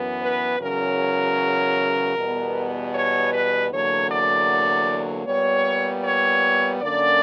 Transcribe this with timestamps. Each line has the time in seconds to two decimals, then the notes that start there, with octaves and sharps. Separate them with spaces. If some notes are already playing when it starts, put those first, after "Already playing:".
Already playing: F#2 E3 B3
0.22 B4
0.61 E2 C#3 F#3 C#4 A#4
2.16 E2 B2 G3 B3
2.93 C#5
3.32 B4
3.71 E2 D3 F#3 A#3 C#5
4.10 D5
5.26 A#2 G3 B3 C#5
6.04 C#5
6.81 F#2 D3 A#3 C#4 D5